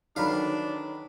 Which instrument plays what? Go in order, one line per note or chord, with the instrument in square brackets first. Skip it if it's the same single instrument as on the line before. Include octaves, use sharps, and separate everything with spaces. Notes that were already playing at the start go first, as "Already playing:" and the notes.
[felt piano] D3 D#3 F#3 [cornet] D4 [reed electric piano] D#4 C#5 [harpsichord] B4 F5